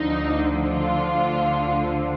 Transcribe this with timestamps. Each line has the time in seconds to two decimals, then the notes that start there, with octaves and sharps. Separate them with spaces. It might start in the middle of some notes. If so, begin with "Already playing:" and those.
Already playing: D2 D3 F3 D#4
0.62 F4